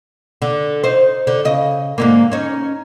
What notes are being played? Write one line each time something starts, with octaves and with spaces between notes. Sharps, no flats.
D3
D#4 C5
D3
C#3 D#5
G#2 D3 A#3
C#4 D#4